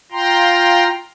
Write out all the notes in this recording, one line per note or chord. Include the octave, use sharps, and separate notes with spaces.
F4 G5 A#5 C6